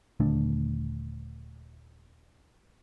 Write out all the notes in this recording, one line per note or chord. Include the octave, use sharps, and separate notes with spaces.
D#1 D3 A3 D4